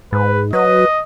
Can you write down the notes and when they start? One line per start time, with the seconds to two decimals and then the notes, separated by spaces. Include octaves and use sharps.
0.13 G#2 B4
0.53 F#3 B4 D#5